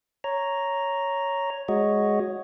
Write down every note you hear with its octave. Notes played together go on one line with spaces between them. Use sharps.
C#5 A#5
G#3 F#4 C#5 D#5